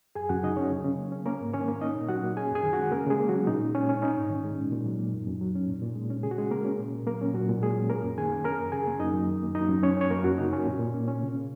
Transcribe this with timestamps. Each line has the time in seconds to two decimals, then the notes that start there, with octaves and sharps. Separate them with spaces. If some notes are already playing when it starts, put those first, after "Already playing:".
0.15 F#2 G#4 G#5
0.29 F#2 F#4 F#5
0.43 C#3 D#4 D#5
0.57 F#3 C#4 C#5
0.72 C#3
0.85 C#3
0.98 A#3
1.12 C#4
1.26 A#3 C#4 A#4
1.41 G#2
1.53 D#3 C#4 C#5
1.68 A#3
1.81 C#4 D#4 D#5
1.95 A#2
2.09 F#3 F#4 F#5
2.23 A#3
2.37 C#4 G#4 G#5
2.51 F#2 G#4 G#5
2.64 D#3
2.73 G#3 F#4 F#5
2.91 C#3 A#3 A#4
3.06 C#3 G#3 G#4
3.20 A#3
3.29 F#3 C#4 F#4
3.47 A#2 D#4
3.62 A#2
3.75 G#3 C#4
3.89 C#4
4.02 C#4 D#4
4.17 G#2
4.30 D#3
4.45 G#3
4.58 A#2
4.72 A#2
4.86 F#3
4.99 A#3
5.13 F#2
5.27 F#2
5.41 F#3
5.55 C#4
5.68 A#2
5.82 A#2
5.96 G#3
6.10 C#4
6.23 C#3 G#4
6.31 F#4
6.38 C#3 G#3 G#4
6.51 A#3 A#4
6.65 C#4
6.79 A#2
6.92 A#2
7.07 F#3 A#3 A#4
7.21 C#4
7.34 A#2 F#3 F#4
7.49 A#2
7.61 G#3 G#4
7.76 C#4
7.89 A#3 C#4 A#4
8.03 F#2
8.17 D#3 G#4 G#5
8.32 A#3
8.44 C#4 A#4 A#5
8.59 F#2
8.72 C#3 G#4 G#5
8.87 A#3
9.00 F#2 D#4 D#5
9.14 F#2
9.28 D#3
9.42 A#3
9.55 F#2 D#4 D#5
9.70 F#2
9.83 F#3 C#4 C#5
9.97 C#4 C#5
10.10 F#2 A#3 A#4
10.24 F#2 F#3 F#4
10.38 C#3 D#4
10.52 F#3 C#4
10.66 A#2
10.79 A#2
10.94 A#3
11.08 C#4
11.22 C#3
11.36 C#3